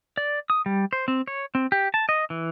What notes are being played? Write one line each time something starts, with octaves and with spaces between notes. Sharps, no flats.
D5
D#6
G3
C5
C4
C#5
C4
G4
A5
D#5
E3